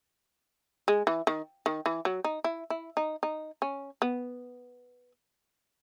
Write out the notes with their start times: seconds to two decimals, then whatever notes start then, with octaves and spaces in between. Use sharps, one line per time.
0.88 G#3
1.07 E3
1.27 D#3
1.66 D#3
1.86 E3
2.05 F#3
2.24 D#4
2.44 E4
2.70 E4
2.97 D#4
3.23 D#4
3.62 C#4
4.02 B3